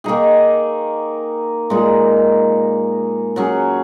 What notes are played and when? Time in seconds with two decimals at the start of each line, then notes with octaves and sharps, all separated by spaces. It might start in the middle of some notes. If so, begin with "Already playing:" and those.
0.04 D#3 A#3 D#4 G#4
1.70 A#2 G#3 D#4
3.36 F#3 C#4 G#4